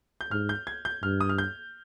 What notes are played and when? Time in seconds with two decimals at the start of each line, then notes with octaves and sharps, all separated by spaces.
0.21 G6
0.31 G#2 F6
0.49 G6
0.67 G#6
0.85 G6
1.03 G2 F6
1.21 D#6
1.29 F6
1.38 G6